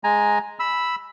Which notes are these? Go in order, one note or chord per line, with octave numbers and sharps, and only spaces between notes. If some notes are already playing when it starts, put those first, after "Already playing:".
G#3 G#5 A#5
B5 E6